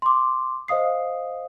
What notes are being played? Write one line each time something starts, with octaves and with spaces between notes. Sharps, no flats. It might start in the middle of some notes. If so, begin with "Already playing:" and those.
C6 D6
C5 D#5 F5 D#6 C7